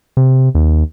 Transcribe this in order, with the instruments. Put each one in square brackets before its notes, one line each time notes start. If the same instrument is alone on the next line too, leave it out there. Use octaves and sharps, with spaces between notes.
[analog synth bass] C3
D#2